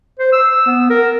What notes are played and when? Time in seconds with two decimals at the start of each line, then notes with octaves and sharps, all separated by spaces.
0.19 C5
0.33 E6
0.66 B3
0.90 A#4